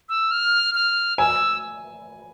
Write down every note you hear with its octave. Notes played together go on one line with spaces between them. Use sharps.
E6
F6
F6
G#5 E6